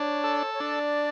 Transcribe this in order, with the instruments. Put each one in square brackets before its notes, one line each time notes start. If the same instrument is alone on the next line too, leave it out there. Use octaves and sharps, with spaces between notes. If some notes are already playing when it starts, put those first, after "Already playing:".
Already playing: [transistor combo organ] D4 [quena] C#5
[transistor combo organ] A4
[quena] C#5
[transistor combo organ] D4 [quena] D5